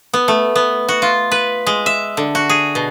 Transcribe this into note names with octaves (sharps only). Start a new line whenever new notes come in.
B3
A3
B3
F#4
F4
B4
G#3
E5
D3
F#4
G#4
B2